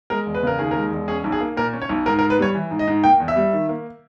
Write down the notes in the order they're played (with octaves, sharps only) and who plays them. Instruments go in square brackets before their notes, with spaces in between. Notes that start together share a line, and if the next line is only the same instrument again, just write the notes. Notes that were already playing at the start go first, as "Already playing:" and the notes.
[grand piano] G#3 A#4
E1
B4
C#3 A#4
D#2 G#4
G#3 A#4
E1
C#4 G#4
B1
G#4
A#3
A#2 A#4
C#4
C#5
B1
G#2 A#4
A#4
G#2
B4
G3 C#5
E3
G#2
D#5
G#2
A#3 G5
E2
E5
G3
D#3
A#3